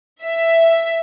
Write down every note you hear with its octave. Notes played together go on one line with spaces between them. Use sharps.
E5 B6